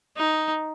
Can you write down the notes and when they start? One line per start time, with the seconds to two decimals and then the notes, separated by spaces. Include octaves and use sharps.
0.16 D#4